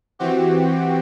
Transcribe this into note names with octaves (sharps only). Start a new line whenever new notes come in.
E3 C4 F#4 G4